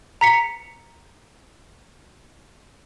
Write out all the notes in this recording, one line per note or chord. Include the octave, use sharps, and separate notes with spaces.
A#5 B6 C#7